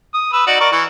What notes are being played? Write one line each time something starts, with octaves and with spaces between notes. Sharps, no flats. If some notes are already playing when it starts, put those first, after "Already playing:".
D#6
B4 E6
D#4 F#4 D5
A#4 D5 C#6
E3 C#6